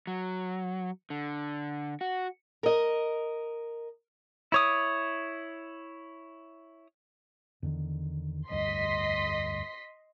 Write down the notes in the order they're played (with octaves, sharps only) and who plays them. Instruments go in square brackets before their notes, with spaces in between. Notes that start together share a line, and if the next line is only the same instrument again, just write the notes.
[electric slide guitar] F#3
D3
F#4
[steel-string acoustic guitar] A#4 D#5
[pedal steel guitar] E4 C#5 D#6
[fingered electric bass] E2 D3 D#3
[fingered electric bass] F1 D2 G2 [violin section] D#5 C6 B6